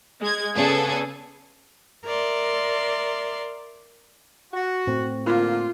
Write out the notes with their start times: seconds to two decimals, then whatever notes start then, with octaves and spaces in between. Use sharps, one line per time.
0.21 G#3 G#6
0.55 C#3 B3 G#4 A4 D5 G#6
2.05 A#4 D5 E5 C6
4.54 F#4
4.87 A2 C4
5.26 A#2 D3 A#3 F4